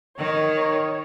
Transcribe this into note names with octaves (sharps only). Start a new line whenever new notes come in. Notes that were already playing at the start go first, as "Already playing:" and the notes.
D#3 C#5